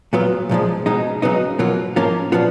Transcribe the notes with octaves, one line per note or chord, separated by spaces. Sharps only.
A#2 F#3 B3 F4
B1 A#2 F3 G#3
B2 G#3 D#4
C#3 F#3 B3 D#4
B2 F#3 A#3 F4
G#2 F3 A#3 C#4 F4
A#2 F3 B3 F4